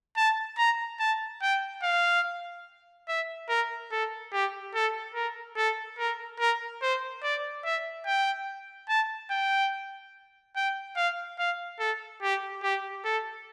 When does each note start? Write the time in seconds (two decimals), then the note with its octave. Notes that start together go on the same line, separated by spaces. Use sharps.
0.17 A5
0.58 A#5
1.00 A5
1.42 G5
1.83 F5
3.08 E5
3.49 A#4
3.92 A4
4.33 G4
4.74 A4
5.15 A#4
5.57 A4
5.98 A#4
6.40 A#4
6.82 C5
7.23 D5
7.65 E5
8.06 G5
8.89 A5
9.30 G5
10.56 G5
10.97 F5
11.39 F5
11.80 A4
12.22 G4
12.63 G4
13.05 A4